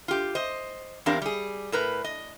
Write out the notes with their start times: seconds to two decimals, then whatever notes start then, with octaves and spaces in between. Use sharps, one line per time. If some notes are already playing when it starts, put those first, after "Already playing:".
0.08 F4 G4
0.35 C5 D#5
1.06 E2 C4 D4 G4 A#4 F5
1.22 G3 G#4
1.72 A2 A#4 B4
2.04 D#5